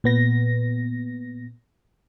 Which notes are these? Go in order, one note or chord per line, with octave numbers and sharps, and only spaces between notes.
A#2 B3 A#6